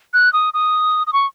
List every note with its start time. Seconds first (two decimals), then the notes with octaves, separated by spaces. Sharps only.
0.13 F#6
0.33 D#6
0.54 D#6
1.07 D#6
1.13 C#6